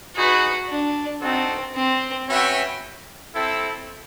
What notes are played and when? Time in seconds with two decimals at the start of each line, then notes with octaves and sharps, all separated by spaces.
0.16 D#4 F#4 G#4 B4
0.69 D4
1.22 C4 D#4 F#4 A4
1.75 C4
2.28 C#4 F#4 B4 E5 G5
3.34 C4 E4 A4